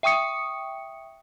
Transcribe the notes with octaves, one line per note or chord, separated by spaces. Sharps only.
E5 G5 C#6 D#6 C#7